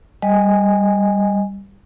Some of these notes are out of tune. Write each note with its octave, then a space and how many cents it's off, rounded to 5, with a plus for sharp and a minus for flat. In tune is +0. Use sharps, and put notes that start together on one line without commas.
G3 +5 D#5 +0 G#5 -5